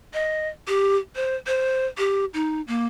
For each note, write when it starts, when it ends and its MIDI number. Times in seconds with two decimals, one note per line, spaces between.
0.14 0.49 75
0.68 0.96 67
1.16 1.35 72
1.47 1.86 72
1.98 2.25 67
2.34 2.61 63
2.67 2.87 58